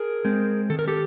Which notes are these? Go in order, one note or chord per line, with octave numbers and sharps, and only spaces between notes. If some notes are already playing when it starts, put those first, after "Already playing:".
Already playing: G#4 A#4
G#3 C4
D#3 A4
A#4
G4 A4